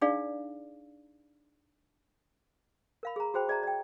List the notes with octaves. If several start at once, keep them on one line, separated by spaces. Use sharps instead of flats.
D4 D#4 G#4 D5 F5
A#4 F5 B5
G#4 A#5
F#4 G#4 C5 G5 B5
G#4 D5 E5 A5 A#5
D5 G5